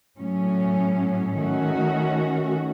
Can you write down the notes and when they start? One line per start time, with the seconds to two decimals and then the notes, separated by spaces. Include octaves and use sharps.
0.19 A2 F#3 C#4
1.36 D#3 A3 C#4 F#4